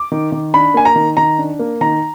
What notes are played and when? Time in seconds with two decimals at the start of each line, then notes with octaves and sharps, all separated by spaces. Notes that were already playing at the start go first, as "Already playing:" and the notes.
Already playing: D6
0.12 D#3
0.32 D#3
0.54 D4 B5
0.74 A#3 G#5
0.85 A#5
0.96 D#3
1.17 D#3 A#5
1.38 D4
1.59 A#3
1.81 D#3 A#5